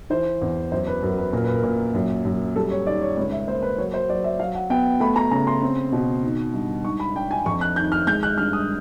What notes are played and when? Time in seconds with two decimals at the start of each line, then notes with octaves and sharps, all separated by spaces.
0.10 E3 C5
0.41 E2
0.72 F#2 C5
0.87 B4
1.02 F#2 A#4
1.18 B4
1.33 A#2 A#4
1.44 B4
1.54 A#4
1.63 A#2
1.94 F#2
2.25 F#2
2.56 G3 A4
2.71 C#5
2.86 D#3 D5
3.02 C#5
3.17 C#2 C#5
3.32 E5
3.48 A#3 C5
3.63 B4
3.78 F#3 C#5
3.94 C5
4.09 F#3 D5
4.24 E5
4.40 F#3 F5
4.55 F#5
4.70 B3 G5
5.00 A3 B5
5.16 A#5
5.31 C#3 A#5
5.47 C6
5.62 C4
5.92 B2
6.23 D#3
6.54 G2
6.85 G#2 C#6
7.00 B5
7.15 D4 G5
7.31 G#5
7.46 F2 C#6
7.61 F#6
7.76 D#3 G6
7.92 F6
8.07 G#3 G6
8.23 F#6
8.38 G2 F6
8.53 D#6